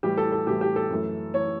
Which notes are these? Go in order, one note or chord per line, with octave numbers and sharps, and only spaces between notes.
A2 E3 G3 G4
A4
A4
A2 E3 G3 G4
G4
A4
F#2 E3 A3
E3 A3 C#5